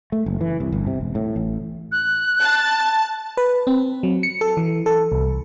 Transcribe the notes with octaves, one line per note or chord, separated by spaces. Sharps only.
A3
F#1
E3
C2
G1
C3
E1
A2
A1
F#6
A5
B4
C4
F#3
C#7
A4
E3
A4
C2